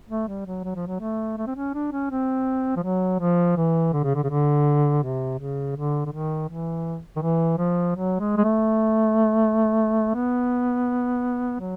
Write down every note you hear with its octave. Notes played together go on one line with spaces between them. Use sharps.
A3
G3
F#3
F#3
F3
F#3
A3
A3
C4
C#4
D4
C#4
C4
F3
F#3
F3
E3
D3
C#3
D3
C#3
D3
C3
C#3
D3
D3
D#3
E3
D#3
E3
F3
F#3
G#3
G#3
A3
B3
F#3